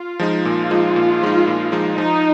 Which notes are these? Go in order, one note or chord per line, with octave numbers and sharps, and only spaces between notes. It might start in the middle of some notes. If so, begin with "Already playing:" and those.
Already playing: F4
F3 G#3 D#4
A#2 F4
F3 G#3 D#4
A#2
F3 G#3 D#4
A#2
F3 G#3 D#4
F3 D#4